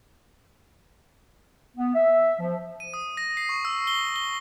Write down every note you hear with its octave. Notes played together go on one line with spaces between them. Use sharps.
B3
E5
F3
D#7
D#6
A#6
C7
C#6
E6
G7
G7